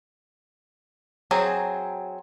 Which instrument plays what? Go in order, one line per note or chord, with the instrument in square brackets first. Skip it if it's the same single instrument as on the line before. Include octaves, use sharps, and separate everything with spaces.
[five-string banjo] F#3 C4 G#4